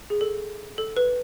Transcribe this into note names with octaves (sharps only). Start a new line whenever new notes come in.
G#4
A4
A4
B4